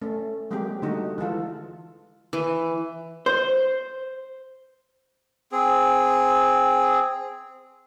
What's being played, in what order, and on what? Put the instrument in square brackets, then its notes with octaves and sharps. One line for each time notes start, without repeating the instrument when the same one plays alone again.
[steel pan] A3 C#4
F#3 G#3 A#3 C4 G4
D3 G3 A3 D#4 F#4
E3 G#3 F4 A4
[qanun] E3
[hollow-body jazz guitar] C5
[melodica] C4 G#4